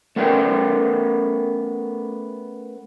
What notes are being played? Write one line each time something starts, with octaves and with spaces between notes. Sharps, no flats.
A3 B3 C#4 A#4 G5